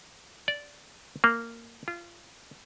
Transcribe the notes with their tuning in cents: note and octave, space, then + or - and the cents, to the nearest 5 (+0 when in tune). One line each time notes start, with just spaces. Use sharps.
D5 -10
A#3 -15
F4 -25